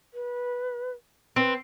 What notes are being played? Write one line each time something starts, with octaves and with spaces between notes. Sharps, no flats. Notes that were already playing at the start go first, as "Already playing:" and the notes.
B4
C4 B4